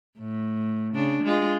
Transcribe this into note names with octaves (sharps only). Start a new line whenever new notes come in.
A2
C#3 D4
G#3 F4